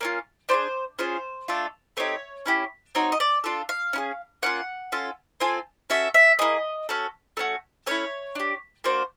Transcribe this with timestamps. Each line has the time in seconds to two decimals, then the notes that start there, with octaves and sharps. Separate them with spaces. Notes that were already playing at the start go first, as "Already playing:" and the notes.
0.01 A#3 C#4 F4
0.49 D4 F4 G#4 C5
0.99 C#4 F4 G#4 C5
1.48 A3 D4 F4 A4
1.97 A3 C4 D#4 G4 C#5
2.46 C#4 E4 G4
2.95 C4 D#4 F#4 C#5
3.12 D#5
3.20 D5
3.44 D4 F4 A4
3.69 F5
3.93 C#4 E4 G#4
4.43 A#3 C#4 F4 F#5
4.92 C#4 F4 A4
5.40 C4 F4 A4 G#5
5.90 C#4 F#4 A4 E5
6.14 E5
6.39 A#3 C#4 E4 G#4 D#5
6.89 C#4 F#4 A4
7.37 A3 C#4 F#4
7.86 A3 C#4 E4 C#5
8.35 D4 G4
8.84 A#3 D4 F#4 C5